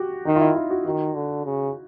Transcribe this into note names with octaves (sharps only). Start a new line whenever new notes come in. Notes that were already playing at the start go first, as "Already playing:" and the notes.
Already playing: F#4 G4
D#3 D#4
F4
E4
F4
F#4
D#3 F#4
D3
C#3